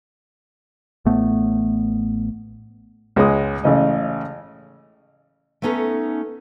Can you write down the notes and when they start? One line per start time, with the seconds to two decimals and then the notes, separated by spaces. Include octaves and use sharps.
1.05 A1 A2 A3 B3
3.16 C#2 G#3 C#4 D#6
3.64 A1 C#3 D#5
5.62 A3 B3 C#4 D#4 A4 B4